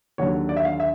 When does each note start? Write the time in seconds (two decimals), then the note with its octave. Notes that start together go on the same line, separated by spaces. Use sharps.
0.18 D#2 D3 F#3 C#5
0.49 D5
0.57 E5
0.65 F5
0.80 E5